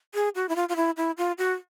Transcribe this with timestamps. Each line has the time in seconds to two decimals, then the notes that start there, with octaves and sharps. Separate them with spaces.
0.14 G#4
0.35 F#4
0.49 E4
0.56 F4
0.69 F4
0.76 E4
0.97 E4
1.18 F4
1.38 F#4